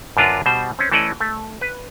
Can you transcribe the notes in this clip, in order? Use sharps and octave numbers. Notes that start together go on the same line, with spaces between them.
F#2 D3 D4 F4 B4 A#5
B2 G3 C5
C4 C#4
E3 A3 C#4 A4 D5 D#5
A3
B4